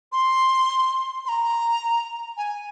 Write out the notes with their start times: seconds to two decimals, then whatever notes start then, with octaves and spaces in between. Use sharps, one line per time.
0.12 C6
1.25 C6
1.29 A#5
2.37 G#5